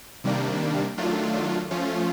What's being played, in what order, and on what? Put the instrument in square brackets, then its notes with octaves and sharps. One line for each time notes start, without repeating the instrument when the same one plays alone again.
[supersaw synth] C3 D#3 G3 A#3 D4
D#3 F#3 A3 D4 F4
F3 A3 C#4 F4